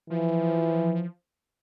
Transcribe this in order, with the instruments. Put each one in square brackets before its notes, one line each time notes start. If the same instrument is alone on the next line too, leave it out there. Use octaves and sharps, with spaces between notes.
[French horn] E3 [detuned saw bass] F3